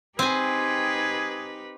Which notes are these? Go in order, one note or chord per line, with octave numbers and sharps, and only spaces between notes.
C4 D#4 G4 G#4 B4 G#5